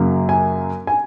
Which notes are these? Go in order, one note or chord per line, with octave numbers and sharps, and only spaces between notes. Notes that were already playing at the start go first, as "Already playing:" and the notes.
Already playing: F#2 C#3 F#3 A#3
G#5
G#5